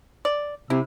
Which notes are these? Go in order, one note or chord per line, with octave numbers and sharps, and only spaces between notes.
D5
C3 E4